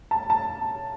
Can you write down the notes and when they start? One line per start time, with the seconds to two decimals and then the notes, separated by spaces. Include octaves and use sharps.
0.11 A5
0.30 A5